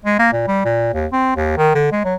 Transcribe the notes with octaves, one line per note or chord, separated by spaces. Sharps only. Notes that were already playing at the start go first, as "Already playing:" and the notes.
G#3
A#3
A#2
G3
A#2
D#2
C4
D#2
D#3
D3
G#3
F#3